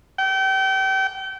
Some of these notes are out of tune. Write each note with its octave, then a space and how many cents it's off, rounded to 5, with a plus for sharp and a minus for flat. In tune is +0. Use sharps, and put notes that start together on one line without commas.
G5 -30